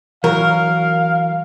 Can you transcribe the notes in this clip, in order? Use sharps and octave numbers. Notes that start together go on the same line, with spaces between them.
E3 F#3 A#4 F5